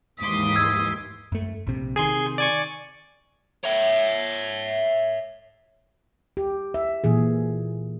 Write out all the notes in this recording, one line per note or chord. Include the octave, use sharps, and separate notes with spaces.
D#2 G#2 E3 C6 D6 D#6 B6
E6 G#6
F#2 A3
A#1 C3
C3 D#3 G#4 G#5 C6
D5 G#5 C#6
C#5 E5
G4
E5
A#2 E3 G#4